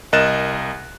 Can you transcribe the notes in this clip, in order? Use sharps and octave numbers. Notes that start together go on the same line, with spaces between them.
C2 A#4 D#5 F#6 A6 E7